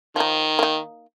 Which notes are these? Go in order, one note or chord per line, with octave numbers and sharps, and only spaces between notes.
D#3 F3 D#4
A#3 D#4